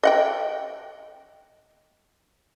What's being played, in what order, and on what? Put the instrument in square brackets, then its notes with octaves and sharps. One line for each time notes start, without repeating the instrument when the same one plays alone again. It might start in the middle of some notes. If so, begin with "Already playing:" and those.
[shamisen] D#5 F#5 G5